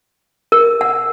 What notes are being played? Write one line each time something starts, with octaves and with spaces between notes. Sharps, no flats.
A#4
F#5